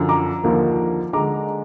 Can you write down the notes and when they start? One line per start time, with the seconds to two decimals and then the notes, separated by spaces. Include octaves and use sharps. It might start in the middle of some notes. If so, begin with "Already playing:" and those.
Already playing: F#2 D3 F3
0.09 A#5 D6
0.44 D#2 D3 F3 A#3
1.13 D3 G#3 A#5 D6